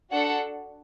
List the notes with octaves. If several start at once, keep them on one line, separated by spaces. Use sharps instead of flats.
D4 F#4 A4 F#5